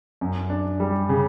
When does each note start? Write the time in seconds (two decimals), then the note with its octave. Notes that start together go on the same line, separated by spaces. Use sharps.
0.21 F#2
0.50 D4
0.80 G3
1.09 C#3